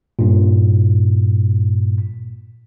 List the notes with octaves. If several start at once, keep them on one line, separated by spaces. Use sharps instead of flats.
G2 A#2